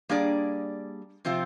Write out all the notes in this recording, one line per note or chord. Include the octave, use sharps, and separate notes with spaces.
G3 A#3 D4 G#4 D5
C3 F3 C4 F4